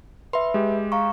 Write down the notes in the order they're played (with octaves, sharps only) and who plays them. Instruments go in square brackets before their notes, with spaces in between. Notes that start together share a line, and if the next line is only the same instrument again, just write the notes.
[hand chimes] B4 E5 [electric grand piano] C6
[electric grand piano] G#3 G4
[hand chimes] F5 A#5 C#6